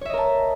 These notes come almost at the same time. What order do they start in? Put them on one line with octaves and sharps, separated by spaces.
C#5 E5 D#5 A#4 A5